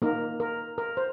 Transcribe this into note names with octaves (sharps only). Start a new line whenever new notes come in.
A#3 D#4 A#4
A#4
A#4
C5